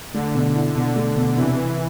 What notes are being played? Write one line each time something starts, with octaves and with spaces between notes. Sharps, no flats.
D3 A3
B2
E4
B2 D3
A3
B2
C3 E3
C3